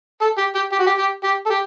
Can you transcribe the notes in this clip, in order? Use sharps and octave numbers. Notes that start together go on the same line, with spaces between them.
A4
G4
G4
G4
F#4
G4
G4
G4
A4
G4